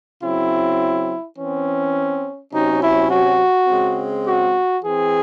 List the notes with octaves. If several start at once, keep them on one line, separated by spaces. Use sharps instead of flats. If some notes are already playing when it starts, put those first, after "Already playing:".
C#3 F#3 C4 E4
E3 C4 C#4
C3 F#3 C#4 D#4
E4
F#4
C#3 G#3 C4
F#4
E3 C4 G#4